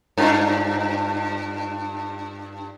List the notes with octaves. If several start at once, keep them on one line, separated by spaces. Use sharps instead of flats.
G2 D4 F4